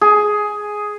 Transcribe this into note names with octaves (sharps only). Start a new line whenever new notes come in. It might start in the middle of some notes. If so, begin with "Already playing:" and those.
G#4